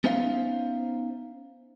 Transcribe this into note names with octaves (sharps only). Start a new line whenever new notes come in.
B3 C#4 D#4 C5 E5 F5